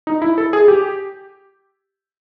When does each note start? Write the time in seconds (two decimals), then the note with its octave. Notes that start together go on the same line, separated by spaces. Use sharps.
0.07 D#4
0.22 E4
0.38 A4
0.53 G#4
0.68 G4